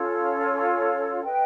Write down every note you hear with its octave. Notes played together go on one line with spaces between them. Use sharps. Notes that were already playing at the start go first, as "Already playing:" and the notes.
Already playing: C#4 F4 A4 C#5
B4 D#5 G5